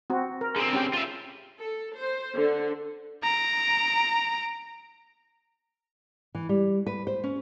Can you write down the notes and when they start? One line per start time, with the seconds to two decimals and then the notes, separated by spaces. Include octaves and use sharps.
0.10 C4 F#4
0.41 A#4
0.56 D3 C4 G#4
0.73 C#4 G4 G5
0.93 F4 E5
1.59 A4
1.96 C5
2.34 D3
3.23 A#5 D7
6.35 E3
6.49 G3
6.87 B4
7.07 C5
7.24 C#4